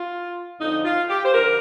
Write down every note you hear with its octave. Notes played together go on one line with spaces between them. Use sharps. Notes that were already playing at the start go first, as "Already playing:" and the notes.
Already playing: F4
F2 D3 F3 D#4
F4
G4
C5
D3 F3 A#4